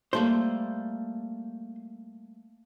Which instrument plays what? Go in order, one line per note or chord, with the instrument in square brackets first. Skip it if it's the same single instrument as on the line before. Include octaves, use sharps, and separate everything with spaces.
[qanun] G3 A3 A#3 [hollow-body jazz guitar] C5